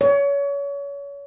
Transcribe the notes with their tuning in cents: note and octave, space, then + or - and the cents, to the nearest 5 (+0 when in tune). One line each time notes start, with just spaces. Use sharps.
C#5 +30